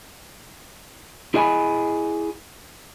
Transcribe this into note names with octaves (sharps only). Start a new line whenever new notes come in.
E4 G#4 D#5 G5 G#5 B5